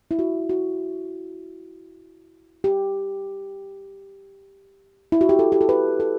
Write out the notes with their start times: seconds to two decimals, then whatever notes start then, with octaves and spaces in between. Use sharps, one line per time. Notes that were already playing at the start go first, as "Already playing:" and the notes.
0.11 E4
0.19 F#4
0.49 F#4
2.64 G4
5.12 E4
5.21 F#4
5.29 G4
5.39 A4
5.52 G4
5.61 A4
5.69 B4
6.00 A4